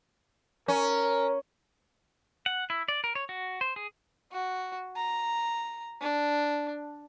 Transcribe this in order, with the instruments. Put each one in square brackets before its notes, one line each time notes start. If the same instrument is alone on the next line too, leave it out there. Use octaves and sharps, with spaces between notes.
[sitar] C#4 [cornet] A#4
[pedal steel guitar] F#5
E4
D5
A#4
C#5
F#4
C5
G#4
[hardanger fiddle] F#4
A#5
D4